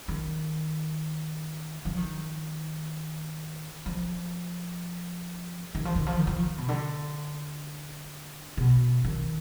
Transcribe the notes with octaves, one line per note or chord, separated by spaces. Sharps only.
D#3
F3
D#3
F3
D#3
F3
D#3
F3
D#3
F3
D#3
B2
D3
B2
D#3